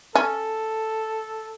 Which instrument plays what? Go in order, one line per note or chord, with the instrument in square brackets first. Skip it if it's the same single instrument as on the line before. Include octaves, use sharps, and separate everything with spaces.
[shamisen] C#4 [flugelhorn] A4